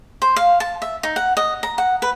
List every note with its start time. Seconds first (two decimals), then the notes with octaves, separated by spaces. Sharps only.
0.22 C5
0.36 F5
0.60 A5
0.82 E5
1.03 D#4
1.16 F#5
1.37 D#5
1.63 A#5
1.78 F#5
2.02 B4